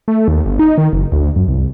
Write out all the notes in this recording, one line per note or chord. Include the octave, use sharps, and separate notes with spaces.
A3
D#2
G1
D#4
D#3
F#1
D2
F#2
C2